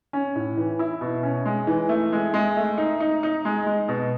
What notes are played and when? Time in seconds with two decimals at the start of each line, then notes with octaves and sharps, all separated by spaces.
0.13 C#4
0.35 A2
0.57 E3
0.79 E4
1.01 B2
1.23 C#4
1.46 G#3
1.67 E3
1.89 A3
2.13 G#3
2.34 G#3
2.57 A3
2.78 D#4
3.00 D#4
3.23 D#4
3.45 G#3
3.67 G#3
3.88 B2